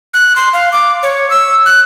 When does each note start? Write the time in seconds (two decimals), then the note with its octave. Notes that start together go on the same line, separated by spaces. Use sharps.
0.14 F#6
0.36 C6
0.53 F5
0.72 D6
1.03 C#5
1.30 E6
1.66 F#6